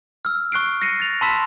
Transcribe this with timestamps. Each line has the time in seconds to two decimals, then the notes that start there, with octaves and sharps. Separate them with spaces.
0.25 E6 F6
0.52 C#6 F#6 C7 D7
0.82 A#6 C7 C#7 D#7
1.00 A6 F7
1.21 A5 B5 C6 E6 B6 E7